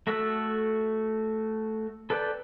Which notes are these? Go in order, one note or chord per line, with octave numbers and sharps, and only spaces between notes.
A3 F#4 A4 E5 E6
A4 B4 D5 G5